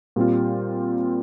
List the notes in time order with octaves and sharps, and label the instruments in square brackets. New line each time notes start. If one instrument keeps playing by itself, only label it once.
[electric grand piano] A#2 G3 C4 F4